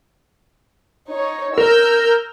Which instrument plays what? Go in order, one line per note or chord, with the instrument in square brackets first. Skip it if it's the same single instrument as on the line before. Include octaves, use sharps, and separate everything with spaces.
[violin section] D#4 C#5
[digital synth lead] A#4 [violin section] E6 F6 G6